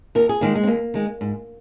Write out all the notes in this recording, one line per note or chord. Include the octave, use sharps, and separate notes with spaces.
D#2 A#4
G#4
D#3 G#3 A#3
G#3
C4
D#2 A#3
D#3 G#3
G#2